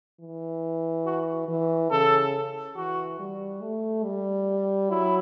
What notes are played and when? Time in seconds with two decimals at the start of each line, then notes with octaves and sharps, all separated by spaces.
0.20 E3
1.06 F#4
1.48 E3
1.91 C#3 A4
2.76 E3 F#4
3.19 G3
3.62 A3
4.04 G3
4.90 F#3 E4